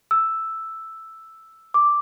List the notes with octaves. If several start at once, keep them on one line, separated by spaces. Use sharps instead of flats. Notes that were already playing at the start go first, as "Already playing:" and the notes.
E6
D6